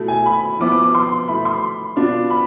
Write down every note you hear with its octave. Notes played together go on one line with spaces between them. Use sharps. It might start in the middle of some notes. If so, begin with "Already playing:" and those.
Already playing: B2 A3 E4
G#5
B5
F3 B3 E4 D6
D6
D6
C6
B2 A3 E4 B5
C6
B2 B3 D4 F4
B5